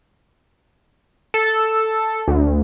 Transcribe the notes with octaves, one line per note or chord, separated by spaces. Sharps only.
A4
D2